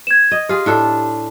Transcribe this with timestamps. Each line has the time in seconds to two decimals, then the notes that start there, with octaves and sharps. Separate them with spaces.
0.07 G#6 E7
0.31 D#5
0.49 F4 G4 G#4
0.66 A2 D4 A4